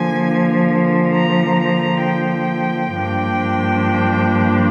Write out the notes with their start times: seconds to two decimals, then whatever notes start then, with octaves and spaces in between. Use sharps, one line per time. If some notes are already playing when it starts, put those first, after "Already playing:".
Already playing: D3 F3 A#3 G#5
1.13 A#5
1.59 A#5
2.04 G5
2.95 G2 F3 A#3 D4